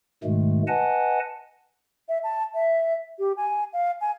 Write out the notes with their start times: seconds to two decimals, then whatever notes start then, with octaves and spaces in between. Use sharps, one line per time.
0.24 G#2 B2 D#3 G#3 A3
0.67 B4 D#5 F#5 G#5 A5
2.09 E5
2.24 A5
2.54 E5
3.19 G4
3.37 G#5
3.73 F5
4.01 G#5